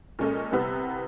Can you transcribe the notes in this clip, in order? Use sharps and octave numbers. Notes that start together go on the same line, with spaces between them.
A#2 G#3 C#4 A4 D#5
C2 C3 B3 E6